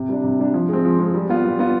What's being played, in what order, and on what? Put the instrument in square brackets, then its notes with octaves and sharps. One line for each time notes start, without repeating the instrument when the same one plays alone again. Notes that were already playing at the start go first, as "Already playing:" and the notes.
Already playing: [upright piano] C3
G3 D4
C3
G3 D4
F3
G#3 C4
F3
G#3 C4
G3
B3 F4
G3
B3 F4